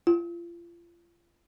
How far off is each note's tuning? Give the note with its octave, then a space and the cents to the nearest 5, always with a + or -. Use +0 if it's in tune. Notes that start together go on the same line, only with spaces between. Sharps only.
F4 -35